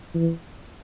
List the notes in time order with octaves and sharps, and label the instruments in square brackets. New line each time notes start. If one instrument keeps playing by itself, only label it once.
[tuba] E3